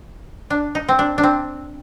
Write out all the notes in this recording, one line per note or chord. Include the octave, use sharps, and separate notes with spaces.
D4
D#4
C4
D4
D4
C4